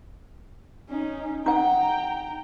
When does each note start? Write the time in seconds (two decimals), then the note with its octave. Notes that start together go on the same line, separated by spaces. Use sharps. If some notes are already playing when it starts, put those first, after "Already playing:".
0.89 C#4 D#4
1.46 D#4 F#5 G5 A#5